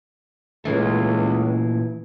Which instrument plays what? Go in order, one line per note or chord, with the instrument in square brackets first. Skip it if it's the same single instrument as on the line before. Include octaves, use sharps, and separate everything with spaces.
[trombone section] C#2 [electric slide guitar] A#2 E3 A3